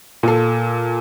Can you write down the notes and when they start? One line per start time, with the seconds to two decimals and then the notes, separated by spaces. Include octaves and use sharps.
0.23 A#2 A4